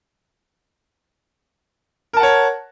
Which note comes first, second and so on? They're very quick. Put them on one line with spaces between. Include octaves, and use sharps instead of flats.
A#4 A5 F#5 C#5